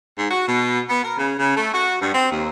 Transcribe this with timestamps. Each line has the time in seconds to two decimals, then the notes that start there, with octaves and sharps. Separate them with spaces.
0.17 G#2
0.30 F#4
0.47 B2
0.88 B3
1.03 A#4
1.17 C#3
1.38 C#3
1.56 A3
1.72 F#4
2.00 G2
2.15 C4
2.31 D#2